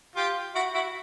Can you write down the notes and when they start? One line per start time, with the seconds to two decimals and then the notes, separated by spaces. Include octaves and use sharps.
0.16 F4 G4
0.55 E4 F#4
0.74 E4 F#4